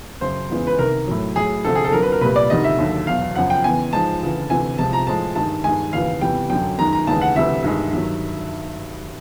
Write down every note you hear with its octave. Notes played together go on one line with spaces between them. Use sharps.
F#2 C#3 F#3 C5
E2 C#3 E3 G#3
B4
C2 C3 D#3 A#4
A2 F#3
A2 F#3 G#4
D2 C3 F3 A4
G#4
A4
F2 D3 F#3 A#4
B4
A#4
C2 A#2 G3 B4
D5
D2 C3 D#3 G3 D#5
E5
D#2 D3 F#3
E2 B2 F#3 F5
F#2 C#3 F3 F#5
G5
E2 C#3 E3 G#5
G#2 F3 G#3 A5
D2 C#3 E3
D2 C3 E3 G#5
C2 C3 F3 G#3 A5
A#5
A2 F3 G#3 A5
G2 D#3 G#3 A5
G2 D#3 G#3 G#5
D#2 C#3 E3 F5
E2 C3 E3 G3 G5
F#2 D3 F#3 G5
F#2 D#3 G#3 A#5
A#5
D#2 C#3 E3 G#3 A5
F#5
D2 C3 E3 G3 E5
G2 D#3 G#3
G2 D#3 F#3